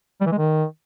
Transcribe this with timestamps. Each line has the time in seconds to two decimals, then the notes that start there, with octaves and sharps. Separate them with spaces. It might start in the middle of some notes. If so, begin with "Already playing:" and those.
0.21 G3
0.27 E3
0.32 G#3
0.38 D#3